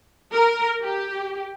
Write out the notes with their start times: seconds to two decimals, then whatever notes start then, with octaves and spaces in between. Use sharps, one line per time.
0.32 A#4
0.80 G4